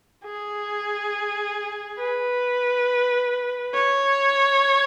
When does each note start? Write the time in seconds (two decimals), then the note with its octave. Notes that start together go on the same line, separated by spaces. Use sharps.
0.25 G#4
1.99 B4
3.74 C#5